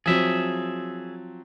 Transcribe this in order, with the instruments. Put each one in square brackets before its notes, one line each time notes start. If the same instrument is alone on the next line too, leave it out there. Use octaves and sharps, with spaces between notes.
[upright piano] F3 F#3 C4 [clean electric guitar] G#4 E5